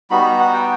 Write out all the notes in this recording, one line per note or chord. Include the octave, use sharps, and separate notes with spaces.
G3 B3 D#4 F#4 B5
A#5
F#5
G5